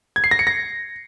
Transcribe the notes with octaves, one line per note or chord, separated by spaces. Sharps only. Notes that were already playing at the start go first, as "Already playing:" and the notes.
G#6
C7
A#6
C#7
A#6